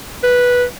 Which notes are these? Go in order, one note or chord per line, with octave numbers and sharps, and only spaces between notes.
B4